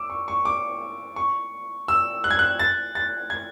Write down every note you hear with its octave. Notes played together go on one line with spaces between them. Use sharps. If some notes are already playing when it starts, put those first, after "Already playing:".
Already playing: D6 E6
C#6
C#6
D6
C#6
E6
F#6
G#6
F#6
A6
A6
G#6